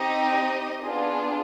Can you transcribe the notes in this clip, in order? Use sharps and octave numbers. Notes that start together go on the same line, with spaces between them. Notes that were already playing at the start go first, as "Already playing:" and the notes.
Already playing: C4 D#4 G4 D#5
B3 D4 F4 G#4